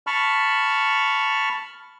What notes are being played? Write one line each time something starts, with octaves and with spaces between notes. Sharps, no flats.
A5 B5 C#6 F6